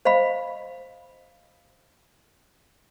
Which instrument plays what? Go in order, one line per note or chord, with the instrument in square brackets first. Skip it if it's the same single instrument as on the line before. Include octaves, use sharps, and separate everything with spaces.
[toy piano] C5 D#5 F5 B5